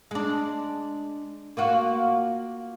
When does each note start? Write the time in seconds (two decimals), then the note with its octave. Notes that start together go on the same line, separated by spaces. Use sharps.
0.11 G#3 D4
1.57 A#3 F4 F#4